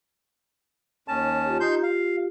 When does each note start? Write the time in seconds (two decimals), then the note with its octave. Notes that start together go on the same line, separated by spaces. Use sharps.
1.08 D#2 C#4 A5
1.46 F4 G4
1.60 D#4 C6 G6
1.83 F5